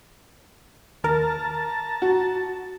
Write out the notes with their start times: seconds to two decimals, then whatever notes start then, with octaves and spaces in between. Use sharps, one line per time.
1.04 D#2 A#4 A5 A#5
2.02 F#4